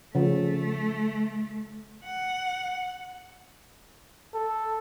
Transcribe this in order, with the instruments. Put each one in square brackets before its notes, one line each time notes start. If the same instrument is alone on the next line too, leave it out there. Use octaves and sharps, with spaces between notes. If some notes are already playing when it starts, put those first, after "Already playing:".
[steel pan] C#3 F3 [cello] A3
[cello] F#5
[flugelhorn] A4